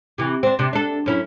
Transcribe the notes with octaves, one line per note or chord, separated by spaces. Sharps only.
C3 E3
C4 D4
C3 D4
D4 A4
F#2 C#4 E4